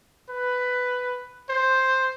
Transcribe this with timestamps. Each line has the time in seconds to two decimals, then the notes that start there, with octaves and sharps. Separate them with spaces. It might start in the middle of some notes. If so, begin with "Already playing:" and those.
0.30 B4
1.50 C5